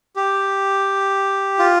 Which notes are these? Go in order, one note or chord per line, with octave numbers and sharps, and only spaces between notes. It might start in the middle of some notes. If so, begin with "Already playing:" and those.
G4
F4